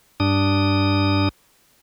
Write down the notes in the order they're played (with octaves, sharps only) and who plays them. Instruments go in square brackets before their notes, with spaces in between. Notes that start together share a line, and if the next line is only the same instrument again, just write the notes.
[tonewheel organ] G2 D4 D#6